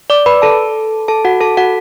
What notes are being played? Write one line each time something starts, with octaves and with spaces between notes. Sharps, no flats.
D5 D6
B4 B5
A4 A5
A4 A5
F#4 F#5
A4 A5
F#4 F#5